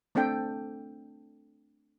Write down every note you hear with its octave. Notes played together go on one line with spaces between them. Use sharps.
A3 C4 D4 A4 G5